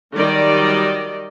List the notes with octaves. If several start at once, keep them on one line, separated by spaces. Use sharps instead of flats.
D#3 F#3 G3 D5 D#5